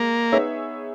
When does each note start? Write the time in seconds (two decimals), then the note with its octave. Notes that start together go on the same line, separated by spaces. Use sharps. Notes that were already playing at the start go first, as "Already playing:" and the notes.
Already playing: G#3 A#3
0.32 B3 D#4 G#4 C#5 E5